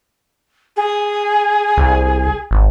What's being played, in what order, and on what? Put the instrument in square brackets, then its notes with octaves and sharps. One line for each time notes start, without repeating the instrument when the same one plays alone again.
[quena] G#4
[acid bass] C2
G#1